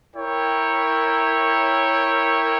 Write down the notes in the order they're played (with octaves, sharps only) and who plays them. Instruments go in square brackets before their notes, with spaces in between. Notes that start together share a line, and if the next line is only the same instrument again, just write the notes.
[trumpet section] E4 A#4 C#5 G5